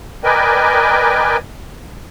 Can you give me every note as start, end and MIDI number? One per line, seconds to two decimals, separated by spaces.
0.24 1.37 70
0.24 1.37 71
0.24 1.37 74
0.24 1.37 75
0.24 1.37 79
0.24 1.37 80